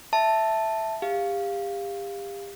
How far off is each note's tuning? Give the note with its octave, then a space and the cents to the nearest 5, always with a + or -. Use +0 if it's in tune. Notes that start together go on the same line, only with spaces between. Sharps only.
E5 +0 A5 +0
G4 +35 F5 +0